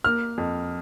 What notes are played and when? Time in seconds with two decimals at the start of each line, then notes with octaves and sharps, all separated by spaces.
0.04 A#3 F6
0.38 F2